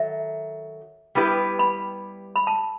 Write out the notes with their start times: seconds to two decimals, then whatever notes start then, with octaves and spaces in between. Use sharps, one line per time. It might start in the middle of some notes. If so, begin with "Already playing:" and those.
Already playing: D#3 F#3 A4 E5
1.15 G3 B3 E4 G4 B4
1.59 B5
2.36 B5
2.47 A5